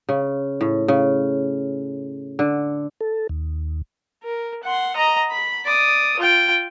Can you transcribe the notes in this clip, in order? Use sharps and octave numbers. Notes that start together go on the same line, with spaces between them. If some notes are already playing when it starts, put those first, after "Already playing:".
C#3
A2
C#3
D3
A4
D#2
A#4
F#5 C6
D#5 A#5
B5
D5 D#6
F4 G5